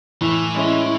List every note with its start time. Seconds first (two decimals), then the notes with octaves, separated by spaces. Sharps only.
0.21 A2 E3
0.55 G#3 C#4 E4